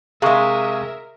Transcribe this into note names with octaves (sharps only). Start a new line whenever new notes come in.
C3 G#3 G#4 A#4 E5 F5 C#6 D#6